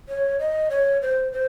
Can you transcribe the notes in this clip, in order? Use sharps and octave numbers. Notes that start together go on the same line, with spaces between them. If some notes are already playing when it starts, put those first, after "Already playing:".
C#5
D#5
C#5
C5
C5